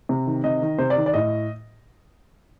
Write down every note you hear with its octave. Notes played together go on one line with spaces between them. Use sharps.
C3
D#3
C3 D#5
D#3
C3 C5
D5
D#3
D5
A2 D#5